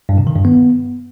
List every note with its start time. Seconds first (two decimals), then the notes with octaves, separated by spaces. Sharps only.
0.09 G2
0.18 C3
0.27 D#3
0.36 G2
0.45 B3